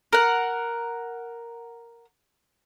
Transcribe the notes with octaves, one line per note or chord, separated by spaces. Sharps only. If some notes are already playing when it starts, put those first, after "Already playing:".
A#4 F#5